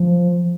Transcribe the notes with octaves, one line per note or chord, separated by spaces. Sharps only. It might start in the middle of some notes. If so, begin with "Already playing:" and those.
Already playing: F3